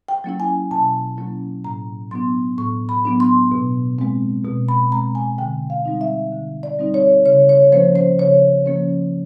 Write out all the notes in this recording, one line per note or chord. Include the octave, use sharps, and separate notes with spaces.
G5
F#3 A#3 C#4 E4
G#5
B2 A5
F#3 A#3 C#4 E4
A2 A#5
F#3 B3 D4 C6
A2 C#6
B5
F#3 B3 D4
C6
B2
G#3 C4
B2
B5
G#3 C4 A#5
G#5
D3 G5
F5
G3 C4 D#4
E5
D3
D5
G3 C4 D#4
C#5
C#3 C#5
C#5
F3 A#3 C#4 C5
C5
C#3 C#5
F3 A#3 C#4